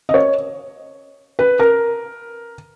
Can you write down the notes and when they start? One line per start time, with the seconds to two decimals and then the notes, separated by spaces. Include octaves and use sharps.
0.09 D#5
0.14 C#5
1.39 B4
1.59 A#4